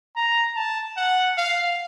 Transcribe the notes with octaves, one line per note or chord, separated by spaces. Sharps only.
A#5
A5
F#5
F5